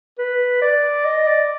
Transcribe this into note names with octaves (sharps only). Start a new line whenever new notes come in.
B4
D5
D#5
D5